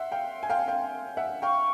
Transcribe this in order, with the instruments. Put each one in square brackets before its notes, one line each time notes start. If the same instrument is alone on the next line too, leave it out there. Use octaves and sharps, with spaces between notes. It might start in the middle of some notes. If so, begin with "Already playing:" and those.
Already playing: [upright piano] E5 F#5 [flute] C6
[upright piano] F5 G5
G#5
F5 G5
F5 G5
E5 F#5
[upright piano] F5 G5 [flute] C#6